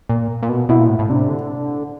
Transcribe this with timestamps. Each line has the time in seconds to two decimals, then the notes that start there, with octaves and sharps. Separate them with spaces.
0.09 A#2
0.42 A#2
0.49 B2
0.69 B2 E4
0.79 A#2
0.89 A2
0.99 A2
1.09 C3 D4
1.29 D3